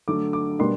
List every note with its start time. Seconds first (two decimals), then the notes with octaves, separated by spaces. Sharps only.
0.08 D3 F#3 A3 D6
0.33 D6
0.59 B2 G3 A#3 D4 C6